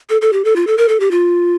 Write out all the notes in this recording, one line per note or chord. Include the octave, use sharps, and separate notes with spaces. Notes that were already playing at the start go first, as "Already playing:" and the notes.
A4
A4
G4
A4
F4
A4
A#4
A4
G4
F4